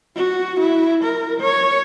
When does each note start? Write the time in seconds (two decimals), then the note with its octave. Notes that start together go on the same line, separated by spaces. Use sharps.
0.16 F#4
0.60 E4
1.04 A#4
1.41 C#5